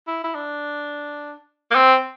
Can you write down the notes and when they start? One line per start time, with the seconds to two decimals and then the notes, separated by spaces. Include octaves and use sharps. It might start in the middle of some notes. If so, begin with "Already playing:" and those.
0.07 E4
0.24 E4
0.35 D4
1.71 A#3
1.75 C4